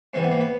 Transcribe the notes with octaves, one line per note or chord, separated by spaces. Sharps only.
G#2 E3 G3 C4
B3
A#3
B3